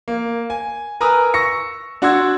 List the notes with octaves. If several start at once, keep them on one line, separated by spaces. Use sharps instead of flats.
A#3
G#5
A#4 B4 G#5 A#5 D#6 E6
C#6 E6 A#6 C#7
D4 F#4 F#5 C6 E6 G#6